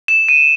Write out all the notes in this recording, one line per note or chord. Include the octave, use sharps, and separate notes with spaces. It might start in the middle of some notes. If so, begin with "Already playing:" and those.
E7
D#7